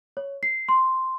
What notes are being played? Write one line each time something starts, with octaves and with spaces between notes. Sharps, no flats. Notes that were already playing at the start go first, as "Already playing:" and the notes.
C#5
C7
C6